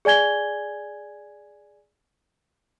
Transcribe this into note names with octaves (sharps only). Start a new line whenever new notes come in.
G#4 D5 G#5 G#6 G7